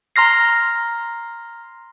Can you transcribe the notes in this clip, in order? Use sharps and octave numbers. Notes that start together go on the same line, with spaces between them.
A#5 C6 F6 A#6 C7